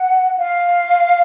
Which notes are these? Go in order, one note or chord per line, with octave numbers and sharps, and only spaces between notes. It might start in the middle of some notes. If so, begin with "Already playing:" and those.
Already playing: F#5
F5